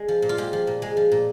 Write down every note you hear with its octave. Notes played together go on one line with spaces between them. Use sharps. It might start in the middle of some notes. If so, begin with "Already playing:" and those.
Already playing: G#3
F3
A#2
F4
G#3 G4
F3
A#2
G#3
F3
A#2